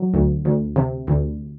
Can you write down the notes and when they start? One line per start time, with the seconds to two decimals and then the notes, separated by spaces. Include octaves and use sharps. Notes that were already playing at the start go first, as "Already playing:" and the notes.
Already playing: F#3
0.14 D2
0.45 D2
0.76 C3
1.07 D2